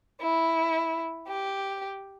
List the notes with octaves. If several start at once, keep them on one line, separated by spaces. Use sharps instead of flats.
E4
G4